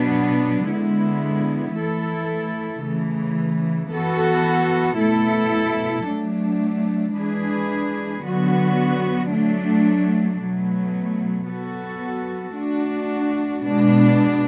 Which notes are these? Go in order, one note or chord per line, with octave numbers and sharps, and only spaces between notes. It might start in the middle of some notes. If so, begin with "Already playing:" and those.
Already playing: B2 F#3 B3 D4
D3 G#3 B3 E4
E3 A3 E4 A4
C#3 E3 A3
E3 B3 F#4 A4
B2 A3 E4 A4
F#3 A3 D4
E3 G#3 D4 G#4 B4
D3 F#3 B3 F#4
F#3 A3 D4
B2 F#3 A3
F#3 B3 F#4 A4
A3 D4 F#4
B2 G#3 D4